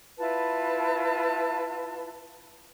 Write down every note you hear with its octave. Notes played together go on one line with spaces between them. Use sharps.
E4 F4 B4 A5